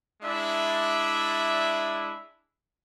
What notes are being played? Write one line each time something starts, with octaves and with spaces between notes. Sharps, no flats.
G#3 D4 E4 D5 E5